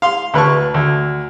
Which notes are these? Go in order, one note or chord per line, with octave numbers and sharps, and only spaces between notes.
F5 C6
D2 B4 A5 C#6
D2